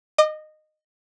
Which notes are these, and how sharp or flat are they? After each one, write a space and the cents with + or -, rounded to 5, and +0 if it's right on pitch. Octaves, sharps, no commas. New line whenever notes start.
D#5 -15 D6 +40